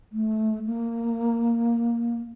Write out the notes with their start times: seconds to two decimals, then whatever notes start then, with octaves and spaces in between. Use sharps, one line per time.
0.12 A3
0.67 A#3